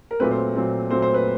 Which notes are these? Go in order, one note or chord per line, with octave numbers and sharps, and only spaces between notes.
A#4
A#2 F#3 A3 C4 B4
C5
A#2 F#3 A3 C4
A#2 F#3 A3 C4 C5
C5
B4